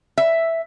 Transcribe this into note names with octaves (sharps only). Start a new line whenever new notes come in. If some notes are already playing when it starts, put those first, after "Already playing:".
E5